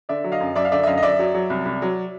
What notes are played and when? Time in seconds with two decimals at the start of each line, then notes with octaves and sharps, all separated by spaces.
0.09 D3 D5 E5
0.24 F#3
0.32 D#5 F5
0.40 F#2
0.55 F#2 D5 E5
0.65 F5
0.72 D3 D5 E5
0.83 E5
0.87 F#2 D#5 F5
0.98 D#5
1.03 F#2 D5 E5
1.19 F#3
1.34 F#3
1.50 C2
1.65 C2
1.82 F#3